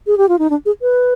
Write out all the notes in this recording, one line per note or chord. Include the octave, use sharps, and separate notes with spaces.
G#4
G4
F4
D#4
D4
G#4
B4